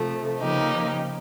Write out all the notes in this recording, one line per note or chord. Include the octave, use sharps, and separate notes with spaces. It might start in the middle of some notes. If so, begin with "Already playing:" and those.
Already playing: C3 F3 A3
C#3 F3 A#3 D#4 G4